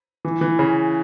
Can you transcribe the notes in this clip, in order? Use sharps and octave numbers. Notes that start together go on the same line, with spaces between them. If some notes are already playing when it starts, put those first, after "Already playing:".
E3
E3
C#3